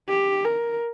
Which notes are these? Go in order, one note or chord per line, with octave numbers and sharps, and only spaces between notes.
G4
A#4